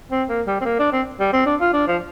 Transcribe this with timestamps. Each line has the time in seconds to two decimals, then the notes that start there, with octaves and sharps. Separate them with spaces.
0.11 C4
0.29 A#3
0.47 G3
0.61 C4
0.65 A#3
0.79 D4
0.92 C4
1.20 G3
1.33 C4
1.46 D4
1.61 F4
1.73 D4
1.87 F3